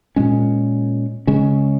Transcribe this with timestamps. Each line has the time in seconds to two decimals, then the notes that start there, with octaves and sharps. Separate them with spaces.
0.16 A#2 G#3 C#4
1.27 C#3 G#3 C#4